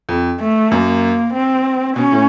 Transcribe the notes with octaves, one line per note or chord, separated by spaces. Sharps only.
F2
A3
F#2 A#3
C4
B2 C#4
A2